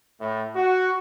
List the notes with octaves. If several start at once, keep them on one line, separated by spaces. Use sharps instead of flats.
A2
F#4